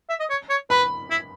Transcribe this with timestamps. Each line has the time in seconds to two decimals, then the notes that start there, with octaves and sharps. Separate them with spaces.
0.09 E5
0.20 D#5
0.30 C#5
0.49 C#5
0.70 B4 B5
1.10 E4